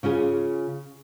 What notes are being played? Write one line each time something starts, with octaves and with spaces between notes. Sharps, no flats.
C#3 C#4 F4 G#4